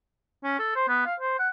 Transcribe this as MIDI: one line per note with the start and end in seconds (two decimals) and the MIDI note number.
0.44 0.59 61
0.59 0.75 69
0.76 0.86 72
0.88 1.02 59
1.06 1.14 77
1.20 1.39 72
1.39 1.49 78